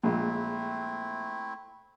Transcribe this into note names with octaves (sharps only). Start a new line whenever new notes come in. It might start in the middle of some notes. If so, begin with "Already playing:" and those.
A#1 G#3 A3 C4 E4